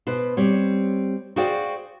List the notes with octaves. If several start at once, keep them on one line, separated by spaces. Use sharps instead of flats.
B2 B4 C5
G3 C4 C#5
F#4 G#4 C5 D5 F5 G5